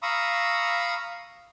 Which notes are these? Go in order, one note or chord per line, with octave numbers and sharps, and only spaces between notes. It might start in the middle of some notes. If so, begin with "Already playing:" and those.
F5 A#5 B5 C#6 D#6 E6